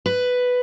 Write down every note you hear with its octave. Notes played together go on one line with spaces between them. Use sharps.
B4